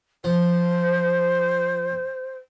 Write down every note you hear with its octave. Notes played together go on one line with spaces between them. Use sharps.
F3 C5